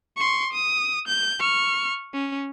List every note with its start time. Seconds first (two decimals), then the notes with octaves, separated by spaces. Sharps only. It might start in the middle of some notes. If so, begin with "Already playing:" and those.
0.17 C6 C#6
0.53 D#6
1.08 G6
1.39 C#6 F6
2.13 C#4